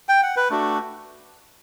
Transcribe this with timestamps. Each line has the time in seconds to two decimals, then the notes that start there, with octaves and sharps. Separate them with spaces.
0.09 G5
0.23 F#5
0.36 B4
0.50 A3 D4 F#4